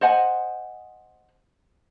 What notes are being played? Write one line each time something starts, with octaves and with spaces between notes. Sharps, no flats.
C5 D#5 F#5 G#5